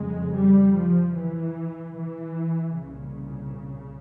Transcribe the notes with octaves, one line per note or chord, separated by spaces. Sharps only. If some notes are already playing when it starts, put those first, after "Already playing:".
Already playing: F2 C#3 G#3
G3
F3
E3
E3
C2 A#2 C#3